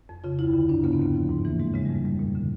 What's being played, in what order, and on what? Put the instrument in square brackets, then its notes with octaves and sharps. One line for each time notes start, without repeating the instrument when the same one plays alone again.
[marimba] F2
C#3 F4
D2 E4
D3
G2 D4
C#3 B3
C4
D#2 B3
F3
G#2
E3 A#3
G#2 G#3
C#3 G#3
G3
F2 G#3
G3
A#2
D3